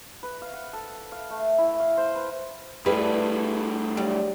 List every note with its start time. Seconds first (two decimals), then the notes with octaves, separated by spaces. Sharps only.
0.23 B4
0.42 F5
0.53 F#5
0.73 A4
1.12 F5
1.30 A3
1.58 E4
1.80 F5
1.97 C5
2.15 B4
2.86 G2 G3 A3 E4 G#4 B4
3.97 F#3 G3